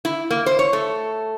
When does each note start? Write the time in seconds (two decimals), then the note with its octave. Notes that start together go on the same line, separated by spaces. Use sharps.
0.05 E4
0.31 A#3
0.46 C5
0.59 C#5
0.73 A3